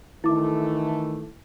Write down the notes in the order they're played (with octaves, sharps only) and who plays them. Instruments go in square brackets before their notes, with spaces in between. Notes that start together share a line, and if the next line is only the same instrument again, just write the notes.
[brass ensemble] D#3 E3 A3 [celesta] E4 D6